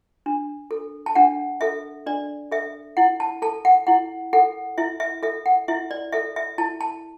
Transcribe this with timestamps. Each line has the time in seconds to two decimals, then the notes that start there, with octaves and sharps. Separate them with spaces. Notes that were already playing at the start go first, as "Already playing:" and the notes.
0.26 D4
0.71 A4
1.06 A5
1.15 D4 F#5
1.61 A4 E5
2.06 D4 D5
2.52 A4 E5
2.97 E4 F#5
3.20 A5
3.42 A4 A5
3.65 F#5
3.87 E4 F#5
4.33 A4 F#5
4.78 E4 E5
5.00 E5
5.23 A4 E5
5.46 F#5
5.68 E4 E5
5.91 D5
6.13 A4 E5
6.36 E5
6.58 E4 A5
6.81 A5